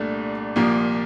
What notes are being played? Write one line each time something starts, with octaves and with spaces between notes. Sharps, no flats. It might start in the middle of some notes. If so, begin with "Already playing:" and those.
Already playing: C2 A#2 A3 D4
C2 A#2 F3 A#3